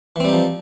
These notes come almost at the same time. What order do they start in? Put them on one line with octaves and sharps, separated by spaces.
E3 C4 G3 D#4 F3